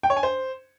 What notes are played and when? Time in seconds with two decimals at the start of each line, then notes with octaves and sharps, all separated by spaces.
0.03 G5
0.10 C#5
0.17 G#5
0.23 C5